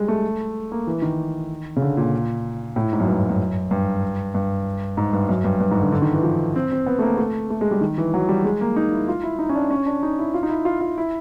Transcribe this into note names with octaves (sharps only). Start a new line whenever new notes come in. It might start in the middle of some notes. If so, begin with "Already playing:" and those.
Already playing: G3 G#3
A3
A#3
E3
D#3
C#3
D3
A#2
A2
G#2
F#2
G2
F#2
G2
G2
G#2
G2
F#2
G2
G2
G#2
D3
D3
D#3
E3
F3
C4
C4
B3
A3
A#3
A3
A3
G#3
G3
D#3
E3
F#3
G3
G#3
A#3
D#4
E4
F4
E4
D#4
C#4
D4
C#4
D4
D#4
E4
F4
D#4
E4
F4
F4
E4